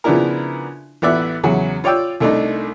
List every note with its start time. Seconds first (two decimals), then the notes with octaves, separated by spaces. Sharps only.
0.04 C#3 F3 B3 D4 E4 A#4
1.02 A1 B3 D5 E5 F#6
1.44 E2 C#3 F#3
1.84 F4 C#5 D5 G5 E6
2.20 C2 A3 D4 D#4